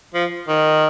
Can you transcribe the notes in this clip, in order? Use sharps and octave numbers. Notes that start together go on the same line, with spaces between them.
F3
D#3